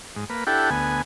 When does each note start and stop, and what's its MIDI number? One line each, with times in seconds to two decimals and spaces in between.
0.16 0.25 44
0.30 0.44 58
0.30 0.44 71
0.47 0.70 62
0.47 0.70 64
0.47 0.70 67
0.47 0.70 69
0.47 0.70 78
0.47 0.70 79
0.70 1.02 38
0.70 1.02 59
0.70 1.02 80